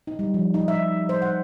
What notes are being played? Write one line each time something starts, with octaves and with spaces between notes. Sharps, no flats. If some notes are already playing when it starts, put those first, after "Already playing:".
D#4
G3
F3
D#4
E5
C5
F#5